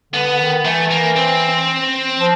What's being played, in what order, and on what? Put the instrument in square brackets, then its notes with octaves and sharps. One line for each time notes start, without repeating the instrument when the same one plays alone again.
[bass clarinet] D3 [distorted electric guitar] B3
[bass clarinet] D3
D#3
[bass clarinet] E3 [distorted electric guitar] A3
[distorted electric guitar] A#3
C4
[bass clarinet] F3